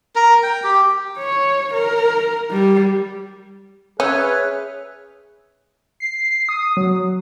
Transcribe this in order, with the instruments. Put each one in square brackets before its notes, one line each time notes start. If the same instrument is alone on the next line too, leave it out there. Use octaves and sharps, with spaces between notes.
[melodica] A#4
G5
G4
[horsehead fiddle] C#5
A#4
G3
[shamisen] C#4 [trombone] G#4 [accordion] B4 C#5 F6 [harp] E5 E6 G6
[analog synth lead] C7
D#6
F#3